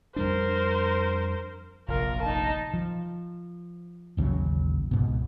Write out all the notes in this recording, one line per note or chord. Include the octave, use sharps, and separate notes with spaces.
F2 G3 D4 A#4 C5
F1 A#1 F4 A#4
D#4 A5
F3
A1 D#2 C#3 F#3
C#2 G#2 B2